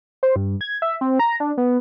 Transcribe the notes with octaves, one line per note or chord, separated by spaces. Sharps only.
C5
G2
G#6
E5
C4
A#5
D4
B3